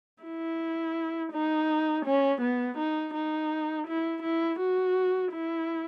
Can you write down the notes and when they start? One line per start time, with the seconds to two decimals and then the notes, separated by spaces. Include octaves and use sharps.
0.24 E4
1.32 D#4
2.06 C#4
2.42 B3
2.78 D#4
3.14 D#4
3.87 E4
4.23 E4
4.59 F#4
5.32 E4